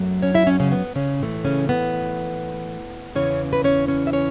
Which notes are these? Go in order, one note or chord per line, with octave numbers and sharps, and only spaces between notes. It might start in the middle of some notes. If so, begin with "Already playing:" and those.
Already playing: F#2 F#3 A3
C#4 C#5
E4 E5
C#4 C#5
C#3 C#4
B3
C#3 C#4
A2 E3 A3
C#3 C#4
B3
E2 C#3 E3 C#4 C#5
B4
C#4 C#5
C#4 C#5
E5
C#4 C#5